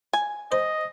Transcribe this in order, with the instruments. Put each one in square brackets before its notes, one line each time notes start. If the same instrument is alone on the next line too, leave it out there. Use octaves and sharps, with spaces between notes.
[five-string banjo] G#5
[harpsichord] C5 [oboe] D#5